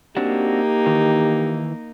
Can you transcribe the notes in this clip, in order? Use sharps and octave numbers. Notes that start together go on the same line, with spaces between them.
A#3 C4 D4 D#4 F#4 G4
D#3 E3